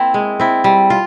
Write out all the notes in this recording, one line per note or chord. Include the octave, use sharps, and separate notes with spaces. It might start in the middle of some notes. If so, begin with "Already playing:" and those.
Already playing: A#3 C4 E4
G#3
C4 E4
G3
F4